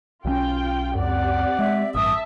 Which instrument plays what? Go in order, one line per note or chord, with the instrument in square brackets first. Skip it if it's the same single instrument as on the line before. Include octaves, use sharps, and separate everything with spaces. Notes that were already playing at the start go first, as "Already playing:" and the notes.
[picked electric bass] B1 E3 C#4 [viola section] F4 G5
[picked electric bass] C#2 F#2 [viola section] C4 G4 D5 [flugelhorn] F#5
[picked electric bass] G#3 [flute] E5
[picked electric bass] A1 G2 [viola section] E5 A5 [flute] D#6